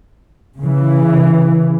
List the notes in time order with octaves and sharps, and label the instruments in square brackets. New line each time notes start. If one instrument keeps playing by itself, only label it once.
[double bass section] C#3 E3